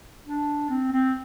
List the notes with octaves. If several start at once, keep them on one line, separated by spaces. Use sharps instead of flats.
D4
C4
C4